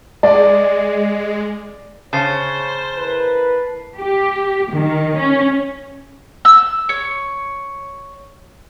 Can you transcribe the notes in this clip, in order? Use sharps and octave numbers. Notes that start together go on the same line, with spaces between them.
G#3 D5
C#3 C5 C#5 A5 A6 C7
E4 A#4 B4
G4
D#3
C#4
E6
C#5